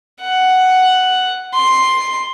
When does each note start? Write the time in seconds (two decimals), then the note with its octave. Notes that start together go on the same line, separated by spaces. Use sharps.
0.22 F#5
1.54 C6